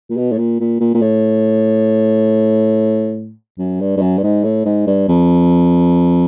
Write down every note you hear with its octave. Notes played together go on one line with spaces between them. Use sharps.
A#2
B2
A2
A#2
A#2
A#2
A#2
A2
F#2
G2
G2
F#2
G2
G#2
A2
G#2
G2
F2